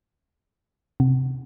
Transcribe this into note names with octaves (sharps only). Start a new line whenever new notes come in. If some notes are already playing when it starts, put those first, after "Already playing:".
C3